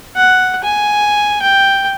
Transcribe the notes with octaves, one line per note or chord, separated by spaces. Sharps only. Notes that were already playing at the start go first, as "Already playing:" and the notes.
F#5
G#5
G5